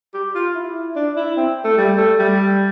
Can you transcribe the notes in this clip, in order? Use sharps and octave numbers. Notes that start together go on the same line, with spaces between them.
G4
F4
E4
D4
E4
C4
A3
G3
A3
G3